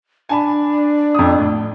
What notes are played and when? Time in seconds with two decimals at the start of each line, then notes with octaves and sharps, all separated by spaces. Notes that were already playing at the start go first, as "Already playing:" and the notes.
0.29 D4 G#5 A5 B5
1.15 F2 D#6
1.39 A2